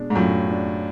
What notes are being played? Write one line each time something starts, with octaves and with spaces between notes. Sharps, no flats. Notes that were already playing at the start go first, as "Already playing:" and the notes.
Already playing: B2 G#3 D4
G#2
F#2 A2 F4
D4